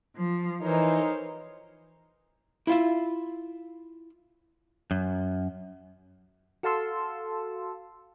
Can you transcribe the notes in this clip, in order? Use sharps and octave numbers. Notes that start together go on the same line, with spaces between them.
F3
E3 D#4 A#4 C5 C#5
E4 F4 E5
F#2
F#4 A4 F5 A5 C6 E6